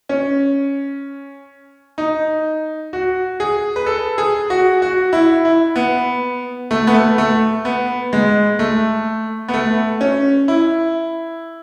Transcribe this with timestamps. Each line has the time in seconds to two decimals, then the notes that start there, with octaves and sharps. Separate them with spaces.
0.09 C#4
1.98 D#4
2.93 F#4
3.40 G#4
3.76 B4
3.86 A4
4.18 G#4
4.50 F#4
4.82 F#4
5.13 E4
5.45 E4
5.76 B3
6.71 A3
6.87 B3
6.95 A3
7.18 A3
7.65 B3
8.13 G#3
8.59 A3
9.48 B3
9.54 A3
10.01 C#4
10.48 E4